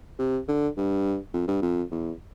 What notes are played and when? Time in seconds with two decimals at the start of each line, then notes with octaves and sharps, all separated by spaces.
0.19 C3
0.48 D3
0.77 G2
1.33 F2
1.48 G2
1.62 F2
1.91 E2